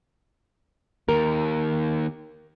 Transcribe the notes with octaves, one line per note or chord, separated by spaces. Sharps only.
D#2 A#4